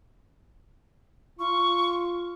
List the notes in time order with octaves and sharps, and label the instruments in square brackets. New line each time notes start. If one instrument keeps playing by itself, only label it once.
[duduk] F4 [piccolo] C#6